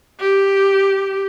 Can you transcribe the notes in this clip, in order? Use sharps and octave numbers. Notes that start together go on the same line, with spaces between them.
G4